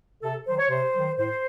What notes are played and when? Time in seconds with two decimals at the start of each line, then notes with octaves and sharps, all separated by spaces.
0.23 C3 A4
0.47 D#3 F#3 C5
0.59 C#5
0.70 C3 C5
0.95 D#3 F#3
1.17 A2 C5